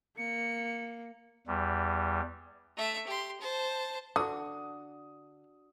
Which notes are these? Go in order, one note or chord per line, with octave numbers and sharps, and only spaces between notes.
A#3 C#7
E2 G3
A3 E5
G4 C6
C5 A5
D3 D4 F#4 D#6